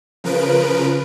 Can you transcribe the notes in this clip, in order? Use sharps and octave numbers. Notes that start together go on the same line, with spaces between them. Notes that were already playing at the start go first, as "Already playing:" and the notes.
C#3 F3 A#4 B4 D7